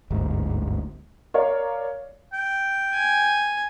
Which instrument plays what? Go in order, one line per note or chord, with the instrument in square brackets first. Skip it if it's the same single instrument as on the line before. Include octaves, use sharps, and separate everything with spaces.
[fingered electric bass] G1 D2 G#2
[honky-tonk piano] A#4 C#5 D5 F5
[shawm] G5
[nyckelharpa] G#5